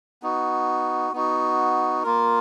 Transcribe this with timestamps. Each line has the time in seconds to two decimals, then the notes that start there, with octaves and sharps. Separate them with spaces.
0.23 B3 D#4 F#4
1.12 B3 D#4 F#4
2.03 A#3 F4 A#4